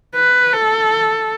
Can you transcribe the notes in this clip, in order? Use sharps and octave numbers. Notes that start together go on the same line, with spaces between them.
B4
A4